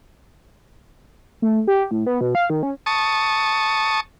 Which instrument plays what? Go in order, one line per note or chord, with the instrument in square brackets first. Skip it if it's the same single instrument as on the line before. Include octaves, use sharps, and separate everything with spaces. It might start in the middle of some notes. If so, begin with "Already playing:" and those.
[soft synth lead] A3
G4
A2
B3
B2
F5
D#3
C#4
[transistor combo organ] A5 C#6 D#6